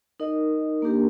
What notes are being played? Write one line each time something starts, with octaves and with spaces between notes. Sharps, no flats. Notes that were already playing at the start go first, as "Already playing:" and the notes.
D#4 A#4 D#5
A#3 D4 G4 A#4